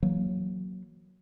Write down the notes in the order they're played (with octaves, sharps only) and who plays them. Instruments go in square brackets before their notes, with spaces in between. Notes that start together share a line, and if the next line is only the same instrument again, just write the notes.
[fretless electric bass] E3 F#3 A#3